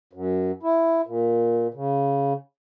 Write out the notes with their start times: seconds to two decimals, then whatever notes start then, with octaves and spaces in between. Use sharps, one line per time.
0.13 F#2
0.63 E4
1.07 A#2
1.74 C#3